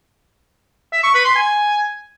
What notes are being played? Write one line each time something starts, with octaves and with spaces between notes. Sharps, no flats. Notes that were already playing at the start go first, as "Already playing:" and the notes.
E5
C#6
B4
C6
G#5